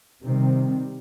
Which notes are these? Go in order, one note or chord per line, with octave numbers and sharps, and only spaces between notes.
C3 D#3 G3 C4